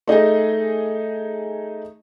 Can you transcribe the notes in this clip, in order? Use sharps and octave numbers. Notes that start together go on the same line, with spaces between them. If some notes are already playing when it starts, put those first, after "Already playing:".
A3 D#4 G#4 D#5